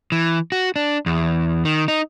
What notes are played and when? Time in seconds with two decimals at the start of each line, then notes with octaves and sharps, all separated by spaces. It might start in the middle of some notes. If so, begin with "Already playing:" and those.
0.12 E3
0.52 F#4
0.76 D4
1.06 E2
1.65 D#3
1.88 D#4